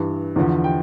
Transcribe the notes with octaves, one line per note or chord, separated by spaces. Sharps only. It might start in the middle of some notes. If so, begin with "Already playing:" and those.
Already playing: G2 E3
E2 D3 F3
G5